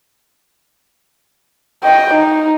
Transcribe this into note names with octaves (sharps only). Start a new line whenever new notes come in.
D#5 G5
D#4